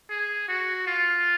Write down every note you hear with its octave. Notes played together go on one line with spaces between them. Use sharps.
G#4
F#4
F4